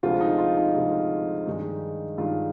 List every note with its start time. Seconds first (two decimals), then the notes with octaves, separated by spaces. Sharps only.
0.03 D2 C3 F3 G#3 F4
0.21 D#4
0.38 F4
0.57 D#4
0.75 D2 C3 F3 G#3
1.47 G2 D#3 G#3 D#4
2.18 G2 D#3 G#3 D#4 F4